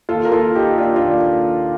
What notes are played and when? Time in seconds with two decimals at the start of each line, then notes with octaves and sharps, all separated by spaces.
0.09 D#2 F4 A4
0.25 A#4
0.32 A#3 F4 A4
0.55 D#3 D#4 G4
0.78 A#3 D4 F4
0.96 D4 F4
1.02 D#2